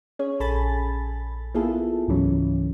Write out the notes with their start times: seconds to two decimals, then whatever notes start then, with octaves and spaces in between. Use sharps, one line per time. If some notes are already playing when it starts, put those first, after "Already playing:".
0.19 C#4 G#4 C#5
0.40 A#1 A4 G#5 B5 A6
1.54 A#3 B3 E4 F4 G#4 A4
2.08 C#2 G#2 E3 F#3 C#4